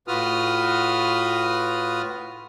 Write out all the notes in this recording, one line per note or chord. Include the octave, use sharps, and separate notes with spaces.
A2 F4 F#4 B4 D#6 F6